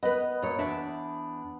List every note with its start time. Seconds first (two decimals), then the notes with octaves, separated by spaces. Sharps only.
0.03 B3 B4 D#5
0.42 A#2 C#5
0.58 E2 D4 E5